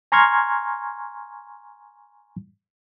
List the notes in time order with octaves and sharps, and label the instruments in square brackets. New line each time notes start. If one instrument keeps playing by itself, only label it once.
[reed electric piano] G#5 A#5 C6 C#6 F6 G#6